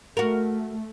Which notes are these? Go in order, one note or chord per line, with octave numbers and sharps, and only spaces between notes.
A3 F#4 A#4